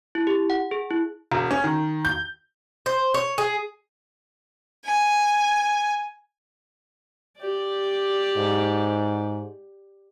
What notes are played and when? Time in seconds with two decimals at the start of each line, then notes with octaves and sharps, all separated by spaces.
0.15 E4
0.27 G4
0.50 F#5
0.71 G#4
0.90 E4
1.32 E1
1.51 C#4
1.64 D#3
2.05 G6
2.86 C5
3.14 C#5
3.38 G#4
4.85 G#5
7.39 G4 D5
8.37 G#2